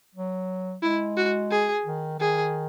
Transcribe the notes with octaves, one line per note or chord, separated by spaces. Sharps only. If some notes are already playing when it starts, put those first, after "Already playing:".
F#3
G#3 E4
F#4
G#4
D#3
D#3 G#4